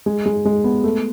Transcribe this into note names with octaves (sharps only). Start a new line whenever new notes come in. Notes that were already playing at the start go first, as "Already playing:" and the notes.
G#3
G#3
G#3
B3
A3